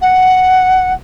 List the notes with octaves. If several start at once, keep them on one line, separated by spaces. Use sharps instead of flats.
F#5